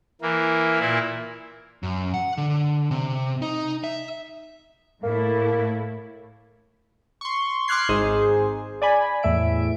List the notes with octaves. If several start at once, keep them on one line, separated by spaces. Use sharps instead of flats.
E3 A#3
A#2 A#3 E4
F#2
F#5
D3
C3
D#4
E5
A2 A3 A#3 E4
C6 C#6
C6 D6 F6 F#6 G#6 C7
G#1 D#4 G#4 C5
D5 G#5 B5
E2 A2 E5 D7